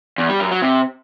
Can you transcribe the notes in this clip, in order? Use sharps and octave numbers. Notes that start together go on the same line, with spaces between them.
E2
G3
F#2
F#3
C3